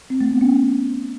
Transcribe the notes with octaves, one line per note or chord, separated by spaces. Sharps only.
C4
A3
B3
C#4